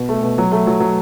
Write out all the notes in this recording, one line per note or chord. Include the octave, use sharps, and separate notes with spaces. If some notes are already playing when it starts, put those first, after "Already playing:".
Already playing: B2
A3
B2
F#3
A3
F#3
F#3